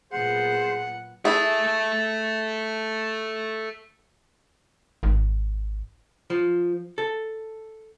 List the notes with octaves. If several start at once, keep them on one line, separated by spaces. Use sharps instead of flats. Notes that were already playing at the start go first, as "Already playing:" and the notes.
A#2 F#3 B3 G#4 C5 F#5
E4 G#4 A4 E5
G#1
F3
A4